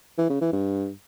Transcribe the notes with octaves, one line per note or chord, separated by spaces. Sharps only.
E3
C#3
E3
G2